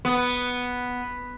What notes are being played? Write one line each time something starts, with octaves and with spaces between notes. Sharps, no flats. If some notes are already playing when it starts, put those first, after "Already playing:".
B3